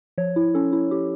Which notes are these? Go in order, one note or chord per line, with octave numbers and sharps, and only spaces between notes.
F3 C#5
E4
C#4 A4
E4
E4 G4